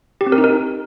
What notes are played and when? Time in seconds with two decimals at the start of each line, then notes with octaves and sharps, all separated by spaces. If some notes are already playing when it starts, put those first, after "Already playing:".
0.21 G4
0.26 C4
0.32 A#4
0.38 D#4
0.44 A#4